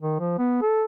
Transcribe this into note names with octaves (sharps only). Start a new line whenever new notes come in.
D#3
F3
B3
A4